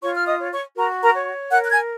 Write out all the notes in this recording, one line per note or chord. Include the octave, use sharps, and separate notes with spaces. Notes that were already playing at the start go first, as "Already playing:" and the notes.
F4 C#5 C#6
F6
D#5 D#6
C#5
C#5 C#6
F#4 A#4 A#5
A#4 A#5
C#5
A#4 F#5 F#6
F#6
G#5 G#6